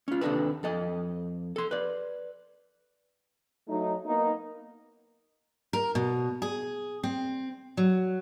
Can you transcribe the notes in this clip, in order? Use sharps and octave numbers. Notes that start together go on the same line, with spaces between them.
C#4 F4
D#2 C3 D4 A4 B4
F2 A4 D#5
A4 C6
B4 D5
F#3 A3 D#4
A#3 B3 D#4
A#4
B2
G#4
C4
F#3